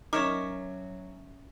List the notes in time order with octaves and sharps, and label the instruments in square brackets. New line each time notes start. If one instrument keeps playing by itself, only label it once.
[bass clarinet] F#3 [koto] C#4 C#5 E5 [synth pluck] D#4 A#4 [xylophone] D6